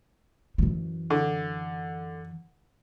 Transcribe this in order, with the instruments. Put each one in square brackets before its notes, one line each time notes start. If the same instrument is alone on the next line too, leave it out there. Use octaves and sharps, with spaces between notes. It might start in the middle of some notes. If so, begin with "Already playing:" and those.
[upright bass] F#2 E3
[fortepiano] D3